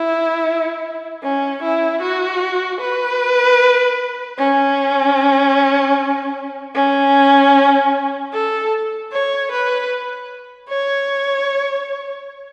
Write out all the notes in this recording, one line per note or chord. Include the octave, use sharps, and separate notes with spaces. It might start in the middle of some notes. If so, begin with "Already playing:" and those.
Already playing: E4
C#4
E4
F#4
B4
C#4
C#4
A4
C#5
B4
C#5